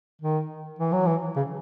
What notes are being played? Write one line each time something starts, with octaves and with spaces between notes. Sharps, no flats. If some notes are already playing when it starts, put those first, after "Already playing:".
D#3
E3
F#3
E3
C#3